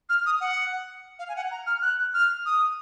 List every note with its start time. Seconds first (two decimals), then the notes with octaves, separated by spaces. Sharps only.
0.09 F6
0.26 D#6
0.41 F#5
1.19 F5
1.29 G#5
1.36 F#5
1.51 A#5
1.67 F6
1.82 F#6
2.14 F6
2.46 D#6